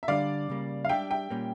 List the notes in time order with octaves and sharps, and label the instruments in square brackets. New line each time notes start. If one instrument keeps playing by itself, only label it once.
[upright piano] E5
[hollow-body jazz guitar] D3 G3 D4 [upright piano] D5 F5
[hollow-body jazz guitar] C#3 G3 A#3
[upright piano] F5
[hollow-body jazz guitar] G3 D4 G4 [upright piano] E5 G5
[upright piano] E5 G5
[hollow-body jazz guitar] A#2 G3 A#3 C#4